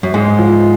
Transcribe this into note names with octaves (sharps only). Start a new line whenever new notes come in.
F#2
G#2 G#3
F3